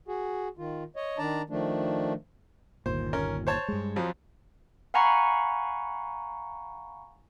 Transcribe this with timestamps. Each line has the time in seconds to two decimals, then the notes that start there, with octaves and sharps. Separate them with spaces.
0.08 F#4 G#4
0.58 D#3 F4
0.96 C#5 D#5
1.18 D#3 D4 D5 A5 A#5
1.50 D#3 F3 A3 D4
2.86 G1 D#2 A#2 C5
3.13 C#4 A#4
3.47 C5 C#5 A5
3.68 G2 G#3
3.96 F2 F3 F#3
4.94 F5 F#5 G#5 A#5 B5 C#6